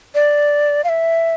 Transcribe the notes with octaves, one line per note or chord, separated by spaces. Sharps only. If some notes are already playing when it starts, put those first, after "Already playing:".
D5
F5
E5